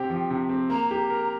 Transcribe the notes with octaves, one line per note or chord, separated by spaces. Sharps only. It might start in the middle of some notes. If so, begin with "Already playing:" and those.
Already playing: C3 C4 G4 G5
F3
C3
C4
A#3 A#5
G4
A#4